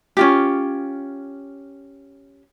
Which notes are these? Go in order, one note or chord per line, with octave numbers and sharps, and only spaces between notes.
C#4 F4 G4